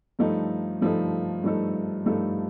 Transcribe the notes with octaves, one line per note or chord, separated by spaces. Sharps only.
G2 F3 A3 D#4 A4
G2 F3 A3 D#4 A4
G2 F3 A3 D#4 A4
G2 F3 A3 D#4 A4